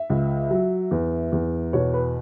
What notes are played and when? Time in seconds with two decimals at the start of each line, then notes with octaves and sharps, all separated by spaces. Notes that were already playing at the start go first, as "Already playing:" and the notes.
Already playing: E5
0.10 C#2
0.51 F#3
0.91 E2
1.32 E2
1.73 B2 C#5
1.94 B4